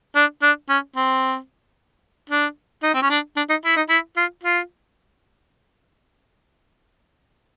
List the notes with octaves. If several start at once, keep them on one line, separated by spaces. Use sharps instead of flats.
D4
D4
C#4
C4
D4
D#4
C4
C#4
D4
D4
D#4
E4
D#4
E4
F4
F4